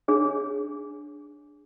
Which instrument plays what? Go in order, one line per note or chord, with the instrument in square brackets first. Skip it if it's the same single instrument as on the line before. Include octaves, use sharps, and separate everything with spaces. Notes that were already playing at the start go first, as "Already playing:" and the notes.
[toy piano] D4 G#4 C#5